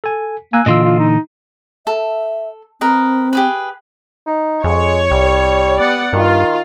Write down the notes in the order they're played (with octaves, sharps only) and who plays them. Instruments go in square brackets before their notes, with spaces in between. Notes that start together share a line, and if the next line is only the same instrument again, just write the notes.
[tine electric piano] A4 G#5
[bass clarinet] A#3 [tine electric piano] G#5 E6 F#6
[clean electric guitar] A#2 D3 E3 [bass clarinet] F4 [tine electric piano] D#5 C6 E6
[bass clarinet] F4
D#4
[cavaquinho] A4 [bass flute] E5
[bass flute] C4 [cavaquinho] A#4 B4 D#5
[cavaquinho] G4 G#4 B4
[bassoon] D#4
[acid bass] F2 [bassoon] G#3 [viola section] C#5
[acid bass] C2 [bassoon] G3
[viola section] B3 D5 F#5
[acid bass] G2 [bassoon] D#3 [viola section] F4